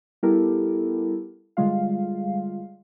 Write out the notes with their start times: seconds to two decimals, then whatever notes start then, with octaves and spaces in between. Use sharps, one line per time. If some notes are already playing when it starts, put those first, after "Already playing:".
0.23 G3 B3 E4 G4 A4 A#4
1.57 D3 G3 G#3 F4 F5